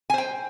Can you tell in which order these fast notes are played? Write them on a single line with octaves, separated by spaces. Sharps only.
G#5 C5 G5